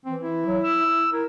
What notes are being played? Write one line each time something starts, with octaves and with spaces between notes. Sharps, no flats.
E3 C4
E4
F#3
E6
E4
E4 A#4